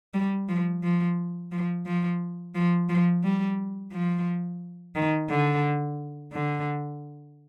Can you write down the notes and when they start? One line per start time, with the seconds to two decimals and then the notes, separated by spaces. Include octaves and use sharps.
0.14 G3
0.48 F3
0.83 F3
1.52 F3
1.86 F3
2.55 F3
2.89 F3
3.24 G3
3.93 F3
4.96 D#3
5.30 D3
6.33 D3